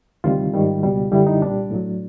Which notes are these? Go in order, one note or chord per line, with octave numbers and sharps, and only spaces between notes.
D2 C3 D#3 G3 F4
G#2 D#3 G3
C#2 B2 G3
F#2 D3 G3 E4
D#4
C2 A#2 G3 D4
A2 F#3